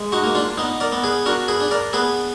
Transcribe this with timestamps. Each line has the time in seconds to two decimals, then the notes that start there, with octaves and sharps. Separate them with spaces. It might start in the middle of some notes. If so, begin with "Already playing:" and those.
Already playing: G#3
0.12 D#4 F#4
0.23 A#3
0.35 D4 F4
0.58 B3 D#4
0.80 A#4 D5
0.92 B3
1.03 G#4 B4
1.26 D4 F#4 A#4
1.48 G#4 B4
1.60 D4
1.71 A#4 D5
1.93 B3 G#4 B4